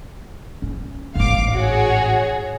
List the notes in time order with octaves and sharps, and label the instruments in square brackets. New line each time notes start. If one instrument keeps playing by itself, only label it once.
[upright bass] C#4
[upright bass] A1 G#2 [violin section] F5 D6
[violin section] F#4 G#4 C#5